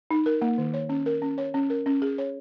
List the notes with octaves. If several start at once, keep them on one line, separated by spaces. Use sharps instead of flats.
D#4
A#4
A#3
D#3
C#5
C#4
A#4
C#4
C#5
C#4
A#4
C#4
G#4
C#5